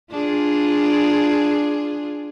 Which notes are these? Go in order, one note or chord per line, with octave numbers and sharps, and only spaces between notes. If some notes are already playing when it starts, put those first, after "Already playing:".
D4 F4 G#4